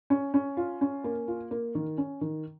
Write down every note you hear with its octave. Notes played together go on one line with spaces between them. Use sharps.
C#4
C#4
F4
C#4
A#3
F4
A#3
D#3
C#4
D#3